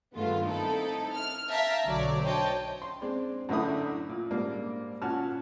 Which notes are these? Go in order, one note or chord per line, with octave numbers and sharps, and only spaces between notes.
G2 D#3 G#3 A3 B3 F4
C4 D#4 E4 A4
F6
E5 F5 G5 A5 A#5
B1 D3 F#3 C#5 D5
C5 C#5 D#5 G5 A5
C6
G#3 C4 D4
F#2 A2 D3 E4 D#6
A#2
G#2 G3 A#3 D4
A#2 C#4 F#4 A5 F6